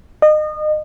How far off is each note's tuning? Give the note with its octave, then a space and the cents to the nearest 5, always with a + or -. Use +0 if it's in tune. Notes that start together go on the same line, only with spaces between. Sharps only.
D#5 -30